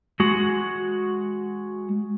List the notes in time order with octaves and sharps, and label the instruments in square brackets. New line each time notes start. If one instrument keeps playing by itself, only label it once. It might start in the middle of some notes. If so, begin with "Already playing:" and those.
[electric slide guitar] G#3 F#4